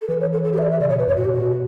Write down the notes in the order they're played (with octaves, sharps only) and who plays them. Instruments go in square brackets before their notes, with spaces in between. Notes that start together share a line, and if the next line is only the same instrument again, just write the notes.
[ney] A4
[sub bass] E3 [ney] B4
[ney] C#5
A4
A4
G4
E5
D5
E5
[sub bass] C#3 [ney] D5
[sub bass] B2 [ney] C#5
[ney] B4
[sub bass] F#2 [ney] C#5
[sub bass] A2 [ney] F#4
[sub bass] B2 [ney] G4
[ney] F#4
[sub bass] B2